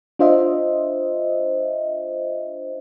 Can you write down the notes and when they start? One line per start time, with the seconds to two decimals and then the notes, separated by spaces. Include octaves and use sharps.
0.19 D4 F4 C5 D#5 E5